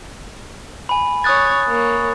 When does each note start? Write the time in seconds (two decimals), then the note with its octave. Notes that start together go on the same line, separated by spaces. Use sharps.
0.89 G#5 B5
1.24 C#5 D#6 F#6 G#6 A6
1.68 A#3 C#5